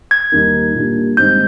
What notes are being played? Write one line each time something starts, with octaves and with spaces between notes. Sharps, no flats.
G#6
D#2 D#3 G3 A#3 D#4
A#2 G3 A#3 D4 G4
G#2 D#3 G3 C4 D#4 G6